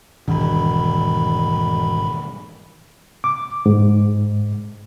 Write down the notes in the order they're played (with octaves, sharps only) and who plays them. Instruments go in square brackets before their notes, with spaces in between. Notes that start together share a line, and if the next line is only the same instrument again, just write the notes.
[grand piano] E1 [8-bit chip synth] G#2 B5 [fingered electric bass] B2 D#3 G3
[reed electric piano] D6
G#2